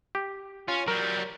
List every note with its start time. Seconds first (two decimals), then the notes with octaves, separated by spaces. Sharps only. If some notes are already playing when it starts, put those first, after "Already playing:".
0.15 G4
0.68 C#4 F4
0.88 F#3 G3 A#4